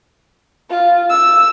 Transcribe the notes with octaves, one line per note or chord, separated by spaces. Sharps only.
F4
E6